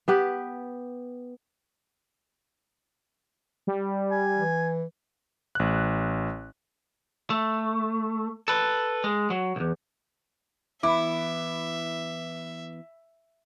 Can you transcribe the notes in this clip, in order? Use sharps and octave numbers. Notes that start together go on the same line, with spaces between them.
B3 G4 B4
G3
G#5
E3
A1 F#6
A3
A4 B4
G#3
F#3
B1 E2
E3 B3 E4 E5 D6